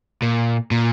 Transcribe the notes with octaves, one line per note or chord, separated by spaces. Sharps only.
A#2
A#2